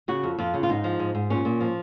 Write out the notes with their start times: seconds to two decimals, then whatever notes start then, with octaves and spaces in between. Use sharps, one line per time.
0.08 C#3 F#4
0.23 F2
0.39 F2 F4
0.54 C#3
0.63 F4
0.69 G#2 D#4
0.84 F3
0.99 G#2
1.15 G#2
1.30 A#2 C#4
1.45 A#2
1.61 F3